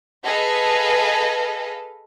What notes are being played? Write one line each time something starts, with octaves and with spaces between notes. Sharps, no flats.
G#4 A4 B4 D#5 F5